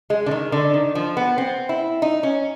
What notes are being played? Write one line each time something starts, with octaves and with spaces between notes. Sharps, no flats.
G#3
D3
D#3
D3
D#3
F3
B3
C4
E4
D#4
C#4